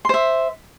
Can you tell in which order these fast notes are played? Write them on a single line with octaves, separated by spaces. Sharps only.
C6 C5 E5